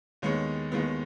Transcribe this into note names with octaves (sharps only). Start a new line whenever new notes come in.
D#2 D#3 G#3 B3 C#5
D#2 D#3 G#3 B3